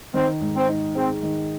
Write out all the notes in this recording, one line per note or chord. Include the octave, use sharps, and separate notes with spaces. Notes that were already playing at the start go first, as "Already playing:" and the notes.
D#3 C4
G#2
C4
D#4
G#3 C4
D#3